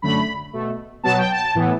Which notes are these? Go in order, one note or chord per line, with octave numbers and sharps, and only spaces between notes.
F#2 D3 A3 B5
B2 A3
B2 F#3 B3 A5
G5
A5
A2 E3 B3